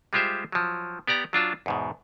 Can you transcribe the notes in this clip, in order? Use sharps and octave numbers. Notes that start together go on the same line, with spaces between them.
G3 G#3 F4 G4 C5 E5
F3 F#3
B3 G4 D5 A#5
F#3 D4 F4 A5
E2 G#2 B2